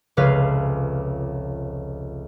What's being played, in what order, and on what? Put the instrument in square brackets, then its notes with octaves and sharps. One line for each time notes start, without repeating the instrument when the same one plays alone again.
[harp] F1 C#2 C#3 B4 F5 C7